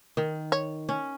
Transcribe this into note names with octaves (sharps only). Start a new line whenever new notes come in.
D#3
C#5
C#4